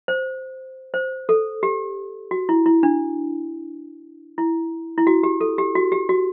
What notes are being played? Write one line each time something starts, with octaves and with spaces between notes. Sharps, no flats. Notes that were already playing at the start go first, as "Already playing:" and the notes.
C5
C5
A4
G4
F#4
E4
E4
D4
E4
E4
F#4
G4
A4
G4
F#4
G4
F#4